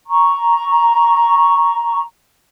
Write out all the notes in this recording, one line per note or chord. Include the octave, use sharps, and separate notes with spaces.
A#5 C#6